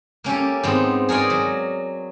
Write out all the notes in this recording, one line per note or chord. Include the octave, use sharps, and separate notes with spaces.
A#3 C#4 G4 A4
G#2 B3 C4
G#4 A#4 C#5 D5 G#5
F#3